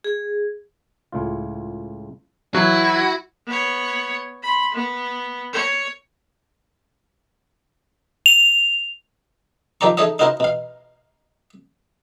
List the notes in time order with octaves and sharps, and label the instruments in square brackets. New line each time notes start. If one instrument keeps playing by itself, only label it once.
[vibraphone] G#4
[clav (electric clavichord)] C#2 A2 F4
[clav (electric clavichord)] E3 [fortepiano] F#3 [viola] E4 [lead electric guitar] F#4
[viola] B3 C#5
B5 C6
B3
C#5
[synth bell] F7
[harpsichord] D#3 F3 G4 D5 A#5 C#6
D#4 G#4 A4 C#5 D#5 E5
D#4 E4 F#4 A#4 C5 D#5
B2 F5